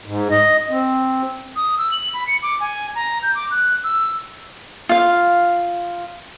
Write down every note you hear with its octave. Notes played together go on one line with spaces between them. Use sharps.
G#2
D#5
C4
D#6
E6
F#7
B5
C#7
D6
G#5
A#5
G6
D6
F#6
E6
F4 F5